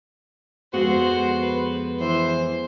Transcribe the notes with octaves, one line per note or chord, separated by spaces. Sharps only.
F2 G#3 B3 F#4 C5
B4
E3 C5